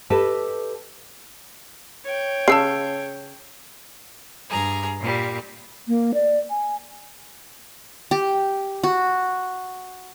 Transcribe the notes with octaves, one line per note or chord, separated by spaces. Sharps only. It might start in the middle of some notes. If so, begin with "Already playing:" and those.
G4 A4 B4 D#5 A5
C#5 G5
C#3 A5 E6 C7
G2 G#4 A#5
A#2 G3
A#3
D5
G#5
G4
F#4